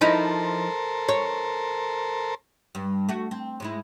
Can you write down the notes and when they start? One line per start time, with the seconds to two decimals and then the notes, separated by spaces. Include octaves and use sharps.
0.01 F3 D#4 E4 A4 A#4 C5
1.09 C#5
2.75 G2
3.09 A3 F#4
3.31 C4
3.60 G#2 G#3 E4